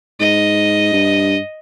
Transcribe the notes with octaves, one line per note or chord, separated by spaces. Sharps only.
G#2 D#5
G2